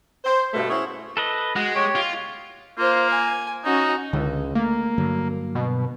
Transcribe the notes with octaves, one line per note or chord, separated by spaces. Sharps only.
C5
G2 B2 A3
A#3 C#4 E4 F#4 G#4 C5
A4 B4 D#5
G#3 F#4
G4 C#5
F4
A#3 F4 C5
G#5
C#4 D#4 F#4
C#2 D3
A3 A#3
G2 D3 F#3
B2